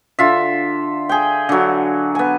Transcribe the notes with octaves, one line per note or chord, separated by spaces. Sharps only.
D3 F4 E5
G#4 G5
D3 F#3
B3 G#5